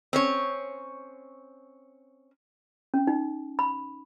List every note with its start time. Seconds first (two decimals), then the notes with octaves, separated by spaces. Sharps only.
0.13 C4 C#4 C#5
2.94 C#4
3.07 D#4
3.59 B5